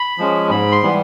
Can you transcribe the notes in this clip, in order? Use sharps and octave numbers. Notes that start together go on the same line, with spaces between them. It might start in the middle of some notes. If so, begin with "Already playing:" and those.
Already playing: B5
F3 G#3 C#4
G#2 B5
C6
E3 G3 B3